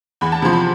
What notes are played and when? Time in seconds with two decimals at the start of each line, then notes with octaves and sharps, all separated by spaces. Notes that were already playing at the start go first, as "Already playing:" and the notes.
0.21 E2 B5
0.32 A5
0.42 C3 F3 C6
0.53 B5